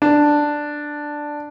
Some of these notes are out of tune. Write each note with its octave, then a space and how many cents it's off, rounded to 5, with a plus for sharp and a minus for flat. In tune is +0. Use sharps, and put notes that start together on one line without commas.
D4 +5